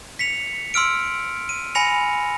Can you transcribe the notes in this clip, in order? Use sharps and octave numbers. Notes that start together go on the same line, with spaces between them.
B6 C#7 F7
C6 E6 F6 D7
D#7
G#5 B5 A#6 C#7 F7